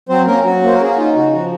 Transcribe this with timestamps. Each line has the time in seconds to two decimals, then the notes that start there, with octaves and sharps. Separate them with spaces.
0.09 F#3 C4 C5
0.27 A#3 C#4 A#4
0.44 F#3 F#4
0.63 A#3 C5
0.74 A#4
0.81 C#4 G#4
0.90 F#4
0.98 D#4 F4
1.15 C#3 F#4
1.33 F3 F#4